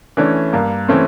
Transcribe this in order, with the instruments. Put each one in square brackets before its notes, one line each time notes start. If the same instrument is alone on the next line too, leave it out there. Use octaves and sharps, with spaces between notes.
[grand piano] E3 A3 C#4 [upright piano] D4
[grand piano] G2 [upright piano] A#3
[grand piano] E3 A3 C#4 [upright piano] C4